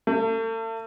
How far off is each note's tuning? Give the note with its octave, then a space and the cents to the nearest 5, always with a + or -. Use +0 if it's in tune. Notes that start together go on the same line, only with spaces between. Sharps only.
A3 +40